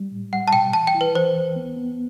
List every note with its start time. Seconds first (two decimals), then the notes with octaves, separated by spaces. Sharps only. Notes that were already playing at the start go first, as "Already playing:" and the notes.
Already playing: G3
0.11 A2
0.33 G3 F#5
0.48 A5
0.53 B2 G5
0.73 E3 A5
0.87 G5
0.95 E4
1.01 B4
1.15 E3 C5
1.35 D2
1.56 B3
1.76 B3